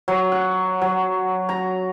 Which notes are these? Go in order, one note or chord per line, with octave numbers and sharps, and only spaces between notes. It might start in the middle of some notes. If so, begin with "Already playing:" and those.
F#3
F#5
F#3
A#5